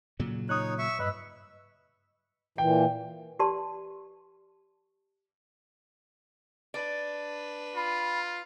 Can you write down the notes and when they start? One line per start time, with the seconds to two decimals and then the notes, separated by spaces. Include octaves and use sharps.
0.20 A#2 C#3 F#3
0.49 D#4 C#5 D#6 F#6
0.78 E5 C#6
0.99 G2 B4 D#5 E6
2.58 A#2 E3 G5
3.39 G4 B4 D5 A5 C6
6.74 D4 B4 D5
7.76 F4 B5